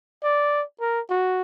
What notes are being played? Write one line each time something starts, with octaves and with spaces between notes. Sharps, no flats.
D5
A#4
F#4